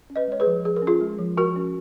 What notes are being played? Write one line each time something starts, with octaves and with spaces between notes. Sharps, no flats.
C#4
B4 D#5
G#3 C#5
G#4 B4
F3
F3 G#4
A#4
C#4
F4 G#4
G#3
F3
F3 F#4 A#4
C#4